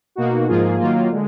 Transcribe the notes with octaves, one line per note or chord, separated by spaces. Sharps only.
B2 A#3 D#4 F#4
G#2 F3 A#3 F4 G#4
D#3 F#3 A#3 F4
D3 G#3